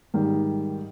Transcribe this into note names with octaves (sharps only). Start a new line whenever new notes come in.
G#2 D#3 G3